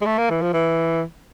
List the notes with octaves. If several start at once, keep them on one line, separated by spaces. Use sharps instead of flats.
G#3
A3
A#3
E3
F3
E3